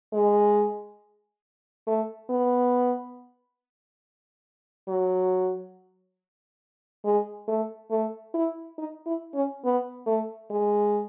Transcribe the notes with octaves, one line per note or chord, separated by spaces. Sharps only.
G#3
A3
B3
F#3
G#3
A3
A3
E4
D#4
E4
C#4
B3
A3
G#3